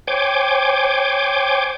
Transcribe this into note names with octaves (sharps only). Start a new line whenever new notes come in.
C5 C#5 G5 G#5 D6